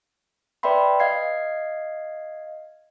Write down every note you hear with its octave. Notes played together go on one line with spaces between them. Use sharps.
B4 D5 E5 G5 B5 C6
D#5 F5 G#6 C7